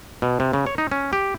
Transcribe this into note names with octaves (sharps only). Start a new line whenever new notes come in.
B2
C3
C#3
C#5
D#4
C#4
G4